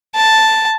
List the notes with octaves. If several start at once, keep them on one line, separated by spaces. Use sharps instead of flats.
A5